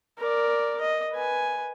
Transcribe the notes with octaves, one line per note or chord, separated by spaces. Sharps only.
A#4 D5
D#5
B4 G#5